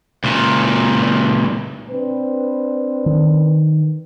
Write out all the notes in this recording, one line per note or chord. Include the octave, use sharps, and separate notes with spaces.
C#2 A#2
C4 D4 B4
D#3